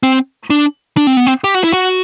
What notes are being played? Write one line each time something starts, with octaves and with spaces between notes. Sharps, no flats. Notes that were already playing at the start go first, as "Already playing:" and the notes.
C4
D4
D4
C4
B3
C4
G4
F#4
E4
F#4